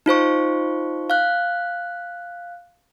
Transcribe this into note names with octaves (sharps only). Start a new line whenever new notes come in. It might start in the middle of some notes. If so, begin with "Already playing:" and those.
D#4 F4 C5 C#6
F5 F#6